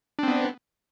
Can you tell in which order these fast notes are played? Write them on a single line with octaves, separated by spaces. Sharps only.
D4 C4 B3